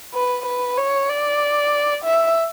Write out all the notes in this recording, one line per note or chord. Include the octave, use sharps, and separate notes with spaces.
B4
B4
C#5
D5
E5